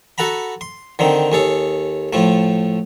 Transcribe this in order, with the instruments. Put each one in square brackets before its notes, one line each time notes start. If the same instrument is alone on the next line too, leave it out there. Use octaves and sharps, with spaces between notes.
[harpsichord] F#4 A4 F#5 A#5 B5
C6
D3 D#3 C4 D#4
D#2 G#4 A4 C#5
A2 F3 A3